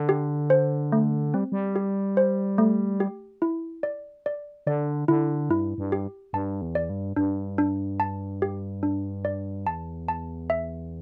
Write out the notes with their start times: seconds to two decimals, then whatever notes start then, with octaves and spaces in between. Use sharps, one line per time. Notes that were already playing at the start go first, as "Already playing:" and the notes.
Already playing: D3
0.09 G4
0.50 C5
0.92 A3
1.34 G3 C4
1.52 G3
1.76 G4
2.17 C5
2.58 A3
3.00 G4
3.42 E4
3.83 D5
4.26 D5
4.67 D3 D5
5.08 D3 E4
5.50 G2 E4
5.78 G2
5.92 G4
6.33 G2 A5
6.62 E2
6.75 D5
6.90 G2
7.16 G2 D4
7.58 D4
8.00 A5
8.42 G4
8.83 D4
9.25 D5
9.67 E2 A5
10.08 A5
10.50 E5